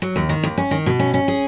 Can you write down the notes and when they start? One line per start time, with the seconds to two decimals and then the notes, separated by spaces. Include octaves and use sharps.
0.02 F#3
0.16 D#2
0.29 D#3
0.43 D#2
0.58 C#4
0.71 D#3
0.86 B2
0.99 C#4
1.14 C#4
1.28 G#4